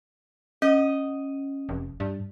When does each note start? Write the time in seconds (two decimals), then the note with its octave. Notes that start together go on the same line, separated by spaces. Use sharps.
0.62 C#4 D#5
1.69 F1
2.00 G2